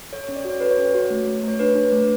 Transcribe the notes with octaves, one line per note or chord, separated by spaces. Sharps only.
A4 C#5
C#4 C#5
D5
F#4 C#5
A4 B4
C#5
C#4
F#4
A3
A3
A3 C#5
D4 B4
D4
A3